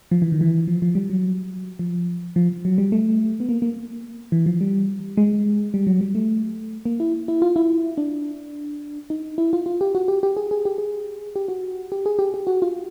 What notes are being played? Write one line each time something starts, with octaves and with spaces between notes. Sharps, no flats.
F3
E3
D#3
E3
F3
F3
G3
F#3
F3
F3
F#3
G3
A3
B3
A#3
A#3
E3
F3
G3
G#3
G3
F#3
G3
A3
A#3
E4
E4
F4
E4
D4
D#4
E4
F4
F4
G4
F#4
G4
G4
G#4
G#4
G4
G#4
G4
F#4
G4
G#4
G4
G4
F#4
F4